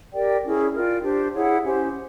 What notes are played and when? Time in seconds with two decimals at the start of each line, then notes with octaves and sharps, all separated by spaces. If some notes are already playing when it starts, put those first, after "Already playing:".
0.13 G4 A#4 D5 G5
0.43 C#4 E4 G#4
0.73 F4 A#4 D5 G5
1.03 D4 G4 C5
1.33 E4 G#4 C#5 F#5
1.64 C#4 E4 G4 C5